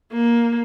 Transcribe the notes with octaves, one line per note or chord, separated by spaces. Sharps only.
A#3